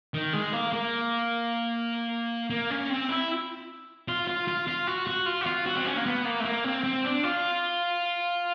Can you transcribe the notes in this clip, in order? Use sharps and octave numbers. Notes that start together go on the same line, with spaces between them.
D#3
G#3
A#3
A#3
A#3
C#4
C4
E4
F4
F4
F4
F4
F#4
F#4
F4
F#4
F4
F#4
C4
C#4
A#3
B3
A#3
A3
A#3
C4
C4
D4
F4